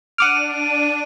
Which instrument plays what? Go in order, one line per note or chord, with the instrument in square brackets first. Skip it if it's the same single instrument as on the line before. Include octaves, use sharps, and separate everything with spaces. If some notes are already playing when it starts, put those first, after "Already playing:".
[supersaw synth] D4 [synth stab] F#5 D6 F6 [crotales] D7 D#7